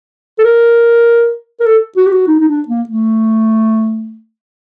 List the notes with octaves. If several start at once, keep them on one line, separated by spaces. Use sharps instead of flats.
A4
A#4
A#4
A4
F#4
G4
F#4
D#4
D#4
D4
A#3
A3